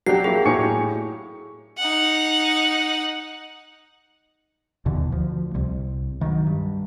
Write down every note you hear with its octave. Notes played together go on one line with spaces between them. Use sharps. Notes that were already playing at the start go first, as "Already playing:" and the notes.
F#3 D4 G4 F#5 C7
A#3 E4 G#4
A2 G#5 C#6 D6 C#7
D#4 F#5
D#2 B2 D3 E3
D2 F3
C2 C3
D#3 E3 F#3
G2